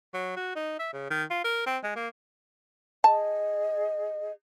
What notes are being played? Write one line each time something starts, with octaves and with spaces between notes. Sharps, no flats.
F#3
F#4
D#4
E5
C#3
D#3
F4
A#4
C4
G#3
A#3
G#4 D#5 A5